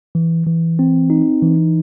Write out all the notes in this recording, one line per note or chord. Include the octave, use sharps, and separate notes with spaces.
E3
E3
C4
D#4
E3